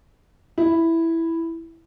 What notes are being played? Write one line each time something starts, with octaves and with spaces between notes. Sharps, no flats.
E4